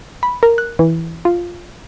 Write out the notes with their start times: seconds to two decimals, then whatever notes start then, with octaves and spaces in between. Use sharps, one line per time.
0.23 B5
0.43 A#4
0.58 F#6
0.79 E3
1.25 F4